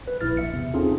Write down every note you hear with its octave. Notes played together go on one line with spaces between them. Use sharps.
B4
A#1 E4 F6 A6
E5 C#7
E2 C3
C4 C#4 D#4 F4 G#4 A4